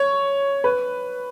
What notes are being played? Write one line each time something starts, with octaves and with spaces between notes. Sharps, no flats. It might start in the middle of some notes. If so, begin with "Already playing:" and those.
Already playing: C#5
B4